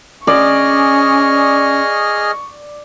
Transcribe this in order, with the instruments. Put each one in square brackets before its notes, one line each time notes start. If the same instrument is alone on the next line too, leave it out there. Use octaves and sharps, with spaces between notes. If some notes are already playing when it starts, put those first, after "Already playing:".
[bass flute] C#4 [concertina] G#4 D#5 F6 [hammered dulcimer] D5 [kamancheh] C#6